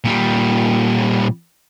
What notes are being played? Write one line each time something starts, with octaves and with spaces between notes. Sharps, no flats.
A#2 G3